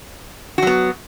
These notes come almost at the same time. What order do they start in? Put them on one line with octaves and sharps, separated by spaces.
F#4 F#3 B3